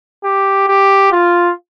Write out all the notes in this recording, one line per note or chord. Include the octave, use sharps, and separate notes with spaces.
G4
G4
F4